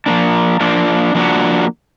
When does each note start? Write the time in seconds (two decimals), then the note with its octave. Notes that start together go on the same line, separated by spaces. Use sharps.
0.06 F3 A#3 D4
0.60 F3 A#3 D4
1.15 F3 A#3 D4 F#4